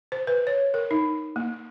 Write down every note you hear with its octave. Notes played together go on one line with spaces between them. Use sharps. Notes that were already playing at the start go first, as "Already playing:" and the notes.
C5
B4
C#5
A#4
D#4
A#3